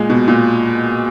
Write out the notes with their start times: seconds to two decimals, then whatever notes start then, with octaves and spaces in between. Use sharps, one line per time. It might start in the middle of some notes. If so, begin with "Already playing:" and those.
Already playing: A#2 G#3
0.10 B2
0.28 A#2